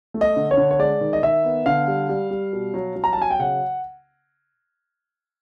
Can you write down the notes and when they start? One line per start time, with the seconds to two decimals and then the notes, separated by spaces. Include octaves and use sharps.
0.14 A3
0.21 D#5
0.36 D3
0.51 C#5
0.57 D3
0.71 C#5
0.79 G#3 D5
1.01 D#3
1.13 D#5
1.22 D#3 E5
1.44 B3
1.66 D3 F5
1.88 G3
2.09 G3
2.31 G3
2.53 B2
2.74 F#3
2.96 F#3
3.04 A#5
3.13 A5
3.18 F#3 G#5
3.30 G5
3.39 C#3 F#5